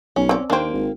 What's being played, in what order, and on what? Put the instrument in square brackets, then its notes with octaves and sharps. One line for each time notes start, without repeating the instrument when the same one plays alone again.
[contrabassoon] B1 [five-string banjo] C#4
[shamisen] C4 D5
[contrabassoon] D#2 [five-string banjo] A#3 G5 [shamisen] D4 C5
[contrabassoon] G#1